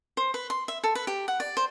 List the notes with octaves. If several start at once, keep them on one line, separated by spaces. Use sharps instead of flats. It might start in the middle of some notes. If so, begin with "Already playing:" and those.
C5
B4
C6
E5
A4
B4
G4
F#5
D5
C5